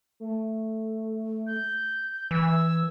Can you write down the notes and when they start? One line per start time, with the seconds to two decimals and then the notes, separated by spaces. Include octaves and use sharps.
0.20 A3
1.47 G6
2.31 E3 E6 G#6